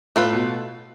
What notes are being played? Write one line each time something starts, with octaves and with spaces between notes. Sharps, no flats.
A2 A3 F4 B4
B2